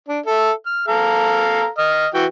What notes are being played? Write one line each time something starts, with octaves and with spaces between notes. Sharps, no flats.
D4
A4 E5
F6
A4 F5 A#5
D#5 F6
E3 F#4 G5